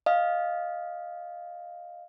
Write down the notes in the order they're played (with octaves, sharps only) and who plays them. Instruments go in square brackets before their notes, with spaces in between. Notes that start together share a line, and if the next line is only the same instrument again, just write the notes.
[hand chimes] D#5 F5